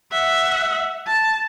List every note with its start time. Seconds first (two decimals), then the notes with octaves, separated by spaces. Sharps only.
0.12 E5 F#5
1.07 A5